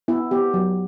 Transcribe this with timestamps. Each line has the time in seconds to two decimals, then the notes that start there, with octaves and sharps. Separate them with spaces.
0.08 B3 E4
0.31 B3 G4
0.54 F#3